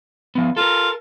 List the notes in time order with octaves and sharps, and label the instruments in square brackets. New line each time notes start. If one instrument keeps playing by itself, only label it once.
[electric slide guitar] F3 B3
[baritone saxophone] F4 [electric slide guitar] A4 A#4